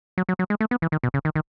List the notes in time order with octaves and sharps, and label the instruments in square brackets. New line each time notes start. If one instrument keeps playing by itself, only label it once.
[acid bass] F#3
F#3
F#3
G#3
A3
B3
E3
D#3
B2
C#3
D#3
D#3